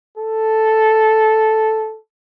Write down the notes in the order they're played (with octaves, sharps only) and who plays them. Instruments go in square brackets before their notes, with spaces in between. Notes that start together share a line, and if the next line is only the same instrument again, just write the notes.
[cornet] A4